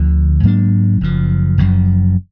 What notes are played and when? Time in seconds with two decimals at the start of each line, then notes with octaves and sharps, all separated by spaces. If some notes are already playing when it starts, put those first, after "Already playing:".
Already playing: D2 D3 F3
0.43 G#2 F#3 A#3 D4
1.01 F#1 F#2 F3
1.58 F#1 F#2 F3